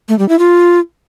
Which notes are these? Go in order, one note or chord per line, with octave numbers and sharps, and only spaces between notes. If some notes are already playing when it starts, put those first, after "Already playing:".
A3
G3
E4
F4